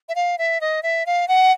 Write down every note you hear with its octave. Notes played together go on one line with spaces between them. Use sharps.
E5
F5
E5
D#5
E5
F5
F#5